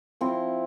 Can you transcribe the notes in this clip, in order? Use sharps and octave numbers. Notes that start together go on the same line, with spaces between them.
F3 C4 E4